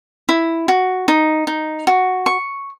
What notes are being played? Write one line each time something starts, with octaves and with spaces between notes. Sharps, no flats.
E4
F#4
D#4
D#4
F#4
C#6